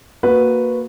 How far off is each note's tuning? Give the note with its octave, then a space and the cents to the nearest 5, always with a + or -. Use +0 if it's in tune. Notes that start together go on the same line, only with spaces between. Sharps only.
A#3 -5 F#4 -15 B4 +0